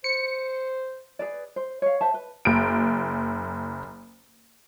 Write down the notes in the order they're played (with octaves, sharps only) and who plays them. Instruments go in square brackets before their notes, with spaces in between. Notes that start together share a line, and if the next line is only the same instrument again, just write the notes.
[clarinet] C5 [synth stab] C#7
[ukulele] G#4 B4 D5
C5
C#5 F5
C5 E5 A5
B4
[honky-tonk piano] F#1 D7